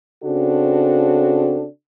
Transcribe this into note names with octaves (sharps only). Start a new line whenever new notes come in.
C#3 C4 D4 F#4 A4